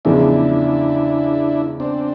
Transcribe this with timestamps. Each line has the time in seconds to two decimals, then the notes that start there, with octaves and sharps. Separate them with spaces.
0.05 E2 C#3 F3 G#3 D4 E4
1.80 C4 D4